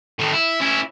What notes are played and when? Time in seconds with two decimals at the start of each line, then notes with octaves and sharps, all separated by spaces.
0.19 A2 D#3
0.33 E4
0.60 C#4 E4